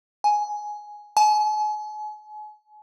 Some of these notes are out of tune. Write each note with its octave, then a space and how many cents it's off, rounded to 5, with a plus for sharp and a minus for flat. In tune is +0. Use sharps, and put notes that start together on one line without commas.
G#5 +5
G#5 +40